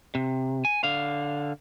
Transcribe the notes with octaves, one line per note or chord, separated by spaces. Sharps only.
C3
G#5
D3 F5